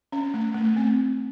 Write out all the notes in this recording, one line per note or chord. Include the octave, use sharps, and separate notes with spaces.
C#4
A3
A3
C4